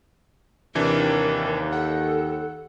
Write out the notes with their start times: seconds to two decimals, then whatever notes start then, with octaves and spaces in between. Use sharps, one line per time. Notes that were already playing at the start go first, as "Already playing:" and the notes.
0.75 D#2 C3 E3 D4 A#4
1.73 A4 F#5